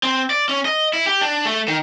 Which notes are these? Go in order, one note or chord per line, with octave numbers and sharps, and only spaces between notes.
C4
D5
C#4
D#5
E4
G4
D4
A3
D#3